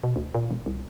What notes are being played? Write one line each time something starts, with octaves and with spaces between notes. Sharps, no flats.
B2
D2
A#2
E1
C2